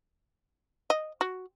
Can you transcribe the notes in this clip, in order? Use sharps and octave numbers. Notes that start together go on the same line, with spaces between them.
D#5
F#4